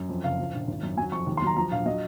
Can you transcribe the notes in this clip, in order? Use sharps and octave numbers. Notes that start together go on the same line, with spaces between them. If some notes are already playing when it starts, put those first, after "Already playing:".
Already playing: F#2
F2
F#1 F5
F3
A#1
G#1
F#2
F#3 G#5
F2 C#6
D#2
C6
F#3 A#5
F3 A#5
A#1 F5
F#3 D#5